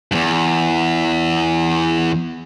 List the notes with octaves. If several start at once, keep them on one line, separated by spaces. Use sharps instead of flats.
E2 G2